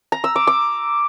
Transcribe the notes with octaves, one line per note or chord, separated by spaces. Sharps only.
A#5
E6
D6
D6